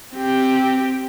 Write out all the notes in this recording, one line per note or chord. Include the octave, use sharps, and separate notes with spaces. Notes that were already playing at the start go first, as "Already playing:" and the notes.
C4 G4